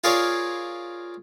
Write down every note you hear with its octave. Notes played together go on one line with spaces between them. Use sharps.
F4 G#4 A#4 C#5 D5 F5